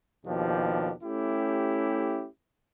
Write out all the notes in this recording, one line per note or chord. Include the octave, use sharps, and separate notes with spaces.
D#2 B2 F3 D4 G4
A3 C#4 E4 G4